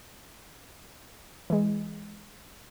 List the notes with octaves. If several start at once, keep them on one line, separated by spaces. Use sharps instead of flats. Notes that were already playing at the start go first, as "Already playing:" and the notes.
E3 G#3